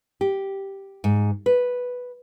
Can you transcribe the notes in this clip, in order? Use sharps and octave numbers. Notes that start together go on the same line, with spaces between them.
G4
G#2
B4